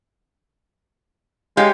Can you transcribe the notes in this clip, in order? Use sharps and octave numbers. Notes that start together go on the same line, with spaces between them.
G#3 G4 C#5 F5